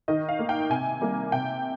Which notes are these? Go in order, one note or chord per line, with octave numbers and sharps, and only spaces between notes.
D#3 D#5
F5
A#3
G5
C3 G#5
G3 A#3
C3 G5